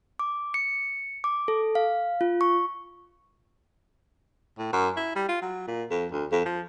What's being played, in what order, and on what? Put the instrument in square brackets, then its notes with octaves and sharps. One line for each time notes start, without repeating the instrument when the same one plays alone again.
[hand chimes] D6
C#7
D6
A4
F5
F4
C#6
[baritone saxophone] A2
F#2
E4
G3
F4
F#3
A#2
F2
D2
F2
F3